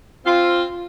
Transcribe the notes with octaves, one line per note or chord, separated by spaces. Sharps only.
C4 F4